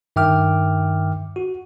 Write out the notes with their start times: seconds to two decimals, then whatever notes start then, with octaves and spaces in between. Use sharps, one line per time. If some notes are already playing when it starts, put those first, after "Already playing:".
0.16 G2 D#3 E5 G5 D6 F6
1.36 F#4